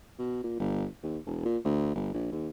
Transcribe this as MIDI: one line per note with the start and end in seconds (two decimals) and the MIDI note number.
0.19 0.42 47
0.44 0.56 46
0.59 0.86 31
1.03 1.18 39
1.26 1.41 28
1.45 1.57 46
1.65 1.91 38
1.95 2.13 31
2.14 2.29 34
2.32 2.49 39